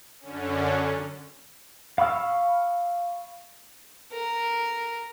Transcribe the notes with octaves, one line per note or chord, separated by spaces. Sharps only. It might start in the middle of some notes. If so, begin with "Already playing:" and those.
F#2 D3 C#4
F5 B5 C#6 E6 F6
A#4